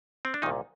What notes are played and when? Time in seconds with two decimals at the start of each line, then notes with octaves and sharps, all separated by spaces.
0.25 C4
0.34 D4
0.42 A#2 D#3 D#4
0.46 C2